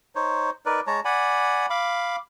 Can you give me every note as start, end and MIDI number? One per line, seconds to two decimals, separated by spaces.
0.15 0.50 63
0.15 0.50 72
0.15 0.50 73
0.66 0.80 63
0.66 0.80 70
0.66 0.80 71
0.66 0.80 74
0.87 1.00 56
0.87 1.00 73
0.87 1.00 81
0.87 1.00 82
1.05 1.66 74
1.05 1.66 78
1.05 1.66 80
1.05 1.66 83
1.70 2.16 77
1.70 2.16 83
1.70 2.16 86